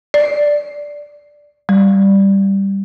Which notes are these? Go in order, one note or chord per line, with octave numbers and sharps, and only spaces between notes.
D5
G3